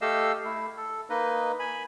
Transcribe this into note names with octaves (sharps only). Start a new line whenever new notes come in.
A3 G4 A4 D#5 F5 E6
A3 E4
A4
A#3 D#4 B4 D#5
G#5 B5